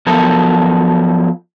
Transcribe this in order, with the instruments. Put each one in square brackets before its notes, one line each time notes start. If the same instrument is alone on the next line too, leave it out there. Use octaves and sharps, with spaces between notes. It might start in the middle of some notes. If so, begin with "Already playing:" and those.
[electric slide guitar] F3 F#3 B3 A4 A#4